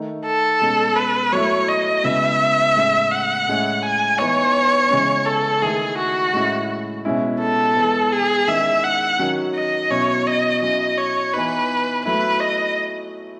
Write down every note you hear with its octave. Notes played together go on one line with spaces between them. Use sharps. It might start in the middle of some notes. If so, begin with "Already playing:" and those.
Already playing: D#3 A3 D#4
A4
B2 G#3 C#4
B4
F#3 A3 E4 C#5
D#5
C#3 G#3 B3 E4 E5
A2 G#3 C#4 E4
F#5
A2 G#3 C#4 E4
G#5
E3 B3 D#4 C#5
C#3 E3 G#3 C#4
A4
D#3 A3 E4 G#4
F#4
A2 G#3 C#4 E4
B2 G#3 C#4 E4
A4
E3 G#3 B3 E4
G#4
D#3 G#3 C#4 E4 E5
F#5
D#3 F#3 C#4
D#5
B2 F#3 C#4 E4 C#5
D#5
F#3 C#4 E4 D#5
C#5
E3 B3 D#4 B4
F#3 A3 E4 B4
D#5